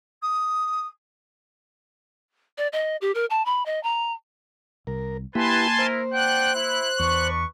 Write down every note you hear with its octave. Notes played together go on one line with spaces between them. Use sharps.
D#6
D5
D#5
G4
A#4
A5
B5
D#5
A#5
C2 A#4
A#3 E4 G4 B4 G#5 A5 B5 C6
E4 A#4 C5
D4 F#5 G5 F#6
E4
E2 D4 B4 C#6